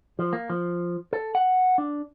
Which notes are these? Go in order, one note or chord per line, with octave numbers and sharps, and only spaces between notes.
F3
A#3
F3
A4
F#5
D4